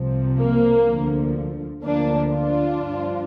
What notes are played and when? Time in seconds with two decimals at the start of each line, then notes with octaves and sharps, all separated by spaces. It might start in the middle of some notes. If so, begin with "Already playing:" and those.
Already playing: C2 C3 F3
0.39 A#3
0.87 D2 D3 F3
1.84 D2 D3 F3 A#3 D4
2.32 D4 F4
2.80 G2 F3